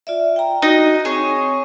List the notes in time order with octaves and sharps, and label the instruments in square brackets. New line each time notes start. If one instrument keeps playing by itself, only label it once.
[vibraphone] F4 D5 E5
G5 A#5
[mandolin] D#4 [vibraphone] F#4
[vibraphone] C4 C#5 C#6 [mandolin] G#4